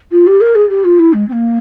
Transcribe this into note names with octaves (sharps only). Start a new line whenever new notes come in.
F4
G4
A#4
G#4
G4
F4
E4
G#3
C4
A#3